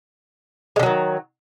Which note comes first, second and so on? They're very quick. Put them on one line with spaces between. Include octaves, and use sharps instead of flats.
G#3 D3 F#3 D#3